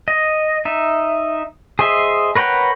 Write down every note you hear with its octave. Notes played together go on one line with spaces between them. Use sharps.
D#5
D#4 E5
G#4 C5 D#5 E5
A#4 B4 C#5 F#5 G5